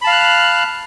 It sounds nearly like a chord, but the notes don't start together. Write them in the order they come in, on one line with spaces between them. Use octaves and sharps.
B5 A5 F5 F6 F#6